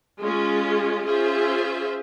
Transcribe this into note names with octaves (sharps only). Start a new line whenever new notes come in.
G#3 C#4 F4
C#4 F4 G#4 C5 E5